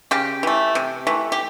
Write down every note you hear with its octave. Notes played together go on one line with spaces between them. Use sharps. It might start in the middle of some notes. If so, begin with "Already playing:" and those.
C#3 G4
E3 A3
C3
E3 A3
G4